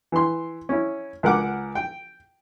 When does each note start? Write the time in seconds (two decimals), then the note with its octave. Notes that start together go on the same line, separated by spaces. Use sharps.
0.12 E3 C6
0.69 C#4 E4
1.23 C#2 A#4 F#5 D6
1.75 G5